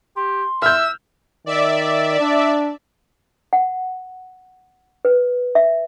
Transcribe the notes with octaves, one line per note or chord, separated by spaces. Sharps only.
G4 C6
E5 E6 F6 G6
D#3 D5 E5
D4
F#5
B4
E5